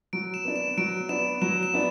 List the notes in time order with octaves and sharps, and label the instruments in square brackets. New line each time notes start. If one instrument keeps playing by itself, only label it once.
[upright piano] F#3 [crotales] D7
[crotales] E7
[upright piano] B3 D4
[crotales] E7
[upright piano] F#3 [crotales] D7
[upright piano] B3 D4 [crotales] E7
[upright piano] F#3 [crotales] E7
[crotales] E7
[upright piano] B3 D4